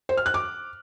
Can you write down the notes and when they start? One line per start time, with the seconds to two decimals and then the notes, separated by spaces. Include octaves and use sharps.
0.09 C5
0.17 F6
0.26 F#6
0.34 D6